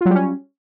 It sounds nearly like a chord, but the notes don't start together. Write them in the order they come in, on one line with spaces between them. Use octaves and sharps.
F4 F#3 G3 C#4